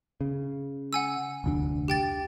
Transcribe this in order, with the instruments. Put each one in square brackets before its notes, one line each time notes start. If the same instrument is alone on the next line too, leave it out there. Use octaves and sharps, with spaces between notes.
[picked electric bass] C#3
[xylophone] F#5 G#5 E6
[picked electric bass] F1 D2 D4
[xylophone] G4 G5 A6